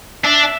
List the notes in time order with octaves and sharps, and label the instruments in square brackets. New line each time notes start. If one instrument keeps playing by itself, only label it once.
[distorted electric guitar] D4 [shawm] E5